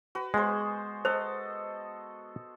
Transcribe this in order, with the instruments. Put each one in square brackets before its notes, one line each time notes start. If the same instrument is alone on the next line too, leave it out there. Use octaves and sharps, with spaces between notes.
[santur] F#4 B4
[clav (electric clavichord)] G#3 [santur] B3 G#4 C5
[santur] A4 D#5 [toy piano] C5